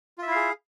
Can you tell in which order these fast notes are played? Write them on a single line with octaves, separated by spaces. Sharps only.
F4 E5 E4 F5 G#4